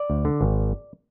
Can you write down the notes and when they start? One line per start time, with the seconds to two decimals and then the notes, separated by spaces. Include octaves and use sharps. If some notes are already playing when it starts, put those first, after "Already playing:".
Already playing: D5
0.10 D2
0.25 D3
0.41 G#1